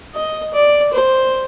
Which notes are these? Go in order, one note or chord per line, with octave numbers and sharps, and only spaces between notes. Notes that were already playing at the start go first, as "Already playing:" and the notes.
D#5
D5
C5